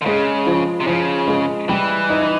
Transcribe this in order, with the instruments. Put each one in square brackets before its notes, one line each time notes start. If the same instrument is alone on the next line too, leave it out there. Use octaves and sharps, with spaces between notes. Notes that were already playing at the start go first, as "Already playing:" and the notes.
[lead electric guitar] D3
[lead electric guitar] C#3 [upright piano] G#3
[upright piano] F3
[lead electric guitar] C3
[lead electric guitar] C#3 [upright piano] F3
[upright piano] G#3
[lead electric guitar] E3 [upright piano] G3
[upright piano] D#4